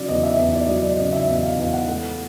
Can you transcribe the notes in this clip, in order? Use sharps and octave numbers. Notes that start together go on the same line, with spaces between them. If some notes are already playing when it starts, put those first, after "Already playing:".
Already playing: C#3 F#3 D5
E2 D#5
E5
E2 D#5
D5
F#3 D#5
D5
C#3 D#5
E5
E2 E5
F5
E2 F5
F#5
A3